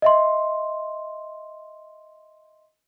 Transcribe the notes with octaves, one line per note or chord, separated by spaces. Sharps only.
D#5 E5 C6